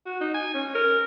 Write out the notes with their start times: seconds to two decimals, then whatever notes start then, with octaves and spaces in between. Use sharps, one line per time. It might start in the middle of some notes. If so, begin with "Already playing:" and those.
0.06 F#4
0.21 D#4
0.35 G#5
0.54 C#4
0.75 A#4